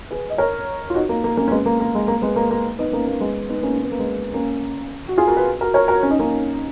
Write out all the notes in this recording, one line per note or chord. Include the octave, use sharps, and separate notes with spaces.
G#4 B4
D#5
A#4 C#5
F4
D#4 F#4
A#3
A#3
A#3 C#4
C#4
G#3 B3
A#3
A#3
G#3
A#3
G#3 B3
A#3
A#3
B3 D#4
A#3 C#4
A#3
G#3 B3
B3 D#4
A#3 C#4
C#4
B3
A#3
G#3 B3
A#3 C#4
F#4
F4 G#4
F#4 A#4
G#4 B4
F#4 A#4
A#4 C#5
F#4 A#4
C#4
D#4
A#3 C#4